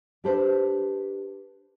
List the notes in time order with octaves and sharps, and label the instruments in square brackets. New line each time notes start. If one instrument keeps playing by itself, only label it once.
[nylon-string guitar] D4 G4 A4 B4 C5